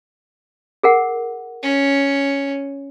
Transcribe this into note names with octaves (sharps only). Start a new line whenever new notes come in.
G#4 A#4 F#5
C#4